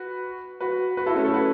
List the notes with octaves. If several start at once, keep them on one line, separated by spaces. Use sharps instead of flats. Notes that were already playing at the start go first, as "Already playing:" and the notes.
Already playing: F#4 B4
F#4 B4
F#4 B4
E4 A4
A3 C#4
A4 C#5
F#4 B4